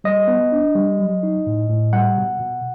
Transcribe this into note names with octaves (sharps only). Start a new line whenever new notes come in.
G3 D#5
B3
D4
G3
F#3
D#4
A2
A2
G3 F#5
B2
B2